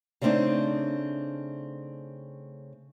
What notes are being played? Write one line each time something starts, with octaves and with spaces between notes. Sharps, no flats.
C#3 G3 A3 C4 D4 D#4